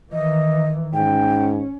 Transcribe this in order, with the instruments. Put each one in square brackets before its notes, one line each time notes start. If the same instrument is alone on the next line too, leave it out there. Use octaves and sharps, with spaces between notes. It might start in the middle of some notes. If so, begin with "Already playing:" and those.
[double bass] D#3 E3 [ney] D#5
[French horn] G#2 [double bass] C#4 [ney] G5